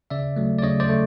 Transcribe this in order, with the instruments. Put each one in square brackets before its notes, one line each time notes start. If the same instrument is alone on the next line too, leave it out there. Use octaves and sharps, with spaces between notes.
[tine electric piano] C#3 D5 E5
F#3 A3
D5
C#3 C#5 D#5
C5 D5
A3